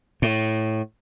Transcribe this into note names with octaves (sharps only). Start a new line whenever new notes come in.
A2